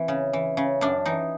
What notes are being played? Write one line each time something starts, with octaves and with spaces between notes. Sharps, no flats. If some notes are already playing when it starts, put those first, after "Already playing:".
Already playing: E3 C4
C#3
E3
C#3
F#2 D4
E3 D#4